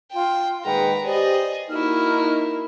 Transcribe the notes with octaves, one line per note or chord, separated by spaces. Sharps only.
F4 G5
A#2 D#3 G#3 B4 F#5 G5 A#5
G4 G#4 C5 D5 D#5
A#3 D#4 E4 F#4 F6